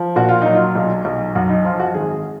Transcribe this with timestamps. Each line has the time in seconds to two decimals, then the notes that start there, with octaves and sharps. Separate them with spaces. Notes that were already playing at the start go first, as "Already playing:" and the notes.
Already playing: F3
0.16 A#2 F#4
0.29 F4
0.42 F#3 D#4
0.55 F4
0.75 B1
1.05 B1
1.35 F#2 F#4
1.50 D#4
1.65 F3 F4
1.80 F#4
1.94 G#1 G#4